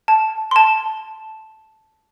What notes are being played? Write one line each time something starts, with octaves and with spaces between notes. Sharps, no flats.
A5
C6
A5